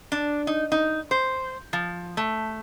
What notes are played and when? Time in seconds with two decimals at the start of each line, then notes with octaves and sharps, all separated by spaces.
0.12 D4
0.47 D#4
0.72 D#4
1.11 C5
1.73 F3
2.17 A3